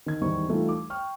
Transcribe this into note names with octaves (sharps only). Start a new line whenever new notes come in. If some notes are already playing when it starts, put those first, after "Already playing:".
D#3 G#6
D#2 G#2 E3 G3 C#6
E3 G3 A3 D#4 F4
D6
G5 C#6 F6